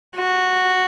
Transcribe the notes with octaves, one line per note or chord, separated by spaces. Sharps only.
F#4